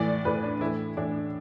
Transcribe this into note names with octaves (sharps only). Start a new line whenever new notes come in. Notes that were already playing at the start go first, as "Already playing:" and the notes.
Already playing: A2 E3 D5
A2 E3 B4
D4
A2 E3 E4
A2 E3 D4